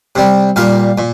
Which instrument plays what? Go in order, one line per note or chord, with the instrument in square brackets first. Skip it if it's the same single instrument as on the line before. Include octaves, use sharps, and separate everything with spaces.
[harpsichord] C3 G3
A#2 G3 F5
A#2